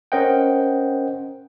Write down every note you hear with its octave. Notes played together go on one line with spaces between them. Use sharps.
C#4 A#4 C5 D#5 F#5 G5